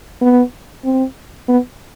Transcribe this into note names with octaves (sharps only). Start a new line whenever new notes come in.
B3
C4
B3